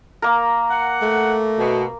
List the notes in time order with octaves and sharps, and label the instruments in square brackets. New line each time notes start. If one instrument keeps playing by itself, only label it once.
[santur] A#3 A#4
[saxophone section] F#5
[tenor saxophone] A3
[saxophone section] B2